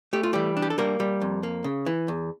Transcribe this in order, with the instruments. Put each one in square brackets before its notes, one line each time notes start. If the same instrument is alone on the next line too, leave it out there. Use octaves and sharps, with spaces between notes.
[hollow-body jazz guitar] A3 G4
F4
E3 G3 G4
D4
G4
A4
G3 A#3 A#4
G3
F2
A#3
C#3
E3
E2